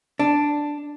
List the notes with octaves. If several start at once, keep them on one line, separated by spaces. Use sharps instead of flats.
D4